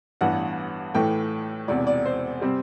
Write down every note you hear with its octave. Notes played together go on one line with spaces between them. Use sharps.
A1 G2 E3 B3 F#5
A2 E3 A3 G5
E1 E2 C3 D5
D5
C5
C3 G3 C4